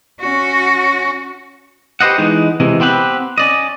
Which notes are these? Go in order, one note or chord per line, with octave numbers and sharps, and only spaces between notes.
C#4 F#4
G4 B4 C5 D#5 F#5
E3 G#3 B3 D#4
C3 E3 G#3
B3 C4 G4 B4
C#4 D5 D#5